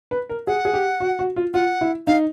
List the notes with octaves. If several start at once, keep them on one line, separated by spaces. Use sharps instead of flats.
B4
A#4
G#4 F#5
G#4
G4
F#4
F#4
F4
F4 F#5
E4
D#4 F5